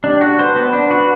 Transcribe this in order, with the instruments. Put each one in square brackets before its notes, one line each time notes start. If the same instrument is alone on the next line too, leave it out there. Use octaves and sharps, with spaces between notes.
[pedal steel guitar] D4 [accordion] G4
[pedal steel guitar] F#4 [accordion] A4
[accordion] B4 [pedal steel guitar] C5
[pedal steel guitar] B3 [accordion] B4
[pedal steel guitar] D4
F#4